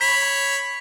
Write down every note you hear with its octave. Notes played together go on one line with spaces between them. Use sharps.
C#5 B5 B6